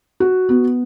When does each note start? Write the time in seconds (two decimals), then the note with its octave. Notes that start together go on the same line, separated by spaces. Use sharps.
0.20 F#4
0.49 B3